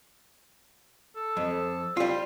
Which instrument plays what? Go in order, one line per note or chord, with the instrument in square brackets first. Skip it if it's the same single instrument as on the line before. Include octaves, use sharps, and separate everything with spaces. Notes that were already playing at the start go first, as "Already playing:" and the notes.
[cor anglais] A4
[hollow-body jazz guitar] F2
G3 F4